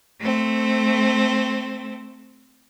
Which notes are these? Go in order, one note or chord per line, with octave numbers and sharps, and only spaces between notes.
A3 C4